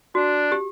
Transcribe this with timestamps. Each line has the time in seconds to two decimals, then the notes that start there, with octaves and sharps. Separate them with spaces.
0.15 D4 F#4
0.52 G4